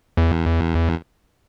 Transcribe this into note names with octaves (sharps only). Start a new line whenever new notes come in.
E2